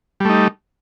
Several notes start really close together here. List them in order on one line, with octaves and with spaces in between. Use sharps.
G3 A3 D#4